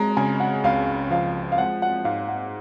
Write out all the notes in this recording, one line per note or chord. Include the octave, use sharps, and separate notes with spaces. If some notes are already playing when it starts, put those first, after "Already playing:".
Already playing: G#3 A#5
C#3 G#5
F#5
C#2 F5
F3 F5
F5
G#3 F#5
F#5
G#2 F5
F#5